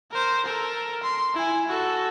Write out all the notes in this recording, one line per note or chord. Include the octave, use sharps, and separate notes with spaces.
A#4 C5
A4 A#4
C6
E4 G#5
F#4 A4